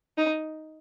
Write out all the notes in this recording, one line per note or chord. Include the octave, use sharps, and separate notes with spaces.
D#4